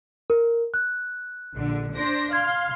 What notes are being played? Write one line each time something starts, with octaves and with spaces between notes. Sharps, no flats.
A#4
F#6
A#1 D3
D4 C5 A#6
F5 C6 G#6